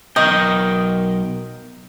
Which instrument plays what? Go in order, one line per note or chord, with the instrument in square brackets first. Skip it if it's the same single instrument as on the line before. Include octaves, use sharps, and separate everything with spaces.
[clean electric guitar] B1 A#4 G5 [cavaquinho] D#5